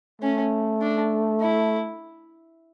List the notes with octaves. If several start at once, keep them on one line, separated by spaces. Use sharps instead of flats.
A3 C#4
D4
E4